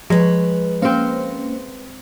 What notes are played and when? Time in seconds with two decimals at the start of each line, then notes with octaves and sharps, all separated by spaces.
0.10 F3 G#3 B4 C#5
0.82 A#3 C4 C#4 C5 F5